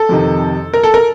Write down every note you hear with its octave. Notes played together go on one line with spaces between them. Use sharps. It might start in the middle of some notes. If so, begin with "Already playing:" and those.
Already playing: A4
F2 C3 D#3
A#4
A4
A#4